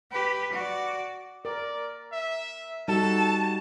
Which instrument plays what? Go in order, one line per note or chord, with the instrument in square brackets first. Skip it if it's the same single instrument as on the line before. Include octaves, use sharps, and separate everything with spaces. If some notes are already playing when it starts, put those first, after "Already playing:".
[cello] G4 B4
F#4 D5
[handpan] A#4 [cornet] D5
[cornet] E5
[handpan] G3 D#4 F#4 [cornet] A4 [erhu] A5